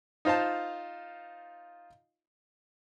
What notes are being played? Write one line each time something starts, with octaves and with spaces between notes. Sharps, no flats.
D#4 F4 C5 F5 A5